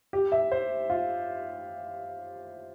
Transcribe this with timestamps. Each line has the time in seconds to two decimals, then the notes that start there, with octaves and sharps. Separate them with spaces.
0.13 G4
0.32 E5
0.52 C5
0.90 F4